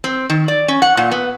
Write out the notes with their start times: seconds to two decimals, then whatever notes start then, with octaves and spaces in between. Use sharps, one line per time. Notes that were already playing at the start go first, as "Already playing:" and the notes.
0.04 C4
0.30 D#3
0.48 D5
0.68 C#4
0.82 F#5
0.97 A#2
1.11 B3